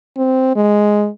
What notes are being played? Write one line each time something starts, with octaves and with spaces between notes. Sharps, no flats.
C4
G#3